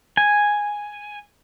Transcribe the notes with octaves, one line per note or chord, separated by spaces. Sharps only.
G#5